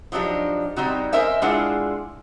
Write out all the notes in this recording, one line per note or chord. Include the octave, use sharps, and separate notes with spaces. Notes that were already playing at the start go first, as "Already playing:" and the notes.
F3 F#3 D4 D#4 G4
G3 C4 D#4 F#4
A#4 C5 D#5 E5 G#5
G#3 D4 E4 F4 G#4 F#5